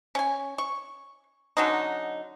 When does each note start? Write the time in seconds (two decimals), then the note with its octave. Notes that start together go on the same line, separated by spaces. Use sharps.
0.15 C#4 G#5
0.58 C#6
1.57 D3 F#3 C#4 D#4